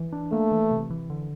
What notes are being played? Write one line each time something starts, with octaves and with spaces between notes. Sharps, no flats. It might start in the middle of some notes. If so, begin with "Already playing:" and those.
Already playing: E3
D4
A3 A#3
E3
C3
E3
D3